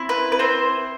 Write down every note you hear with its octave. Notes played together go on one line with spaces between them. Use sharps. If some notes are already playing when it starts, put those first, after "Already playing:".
Already playing: C4 E4
B4
B4
C4 C5